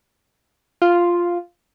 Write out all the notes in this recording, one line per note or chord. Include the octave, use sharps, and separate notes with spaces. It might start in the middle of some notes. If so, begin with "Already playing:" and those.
F4